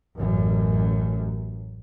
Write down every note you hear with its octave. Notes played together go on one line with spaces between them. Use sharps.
A1 F#2